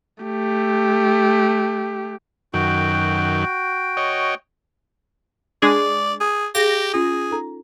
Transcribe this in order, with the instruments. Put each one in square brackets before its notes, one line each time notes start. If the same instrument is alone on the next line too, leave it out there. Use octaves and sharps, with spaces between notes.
[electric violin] A3 G4
[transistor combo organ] F#2 D#3 [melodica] F#4 G5
[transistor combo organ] C#5 D#5
[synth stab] G#3 D4 G#4 [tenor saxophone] D5
[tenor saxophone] G#4
[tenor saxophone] G4 [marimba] G#4 F5 [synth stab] A#6
[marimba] C#4 F4 [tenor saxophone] G#4
[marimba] D#4 A4 A#5